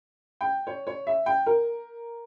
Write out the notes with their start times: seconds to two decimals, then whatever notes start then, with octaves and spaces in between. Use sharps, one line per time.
0.41 G5
0.67 C#5
0.87 C#5
1.07 E5
1.26 G5
1.46 A#4